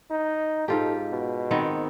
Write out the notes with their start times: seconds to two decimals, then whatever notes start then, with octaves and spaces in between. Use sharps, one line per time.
0.10 D#4
0.68 G#2 F4 G4 A4
1.11 B2
1.51 D#3 B3 C4